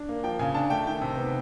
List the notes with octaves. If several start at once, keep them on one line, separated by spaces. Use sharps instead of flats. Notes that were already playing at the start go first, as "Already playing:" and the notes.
Already playing: D4
A#3
F3 G5
C#3 G#5
D4 A5
A3 G5
D#3 G5
C3
B3